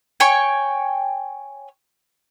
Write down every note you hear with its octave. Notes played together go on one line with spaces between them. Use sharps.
C#5 G5 G#5 C#6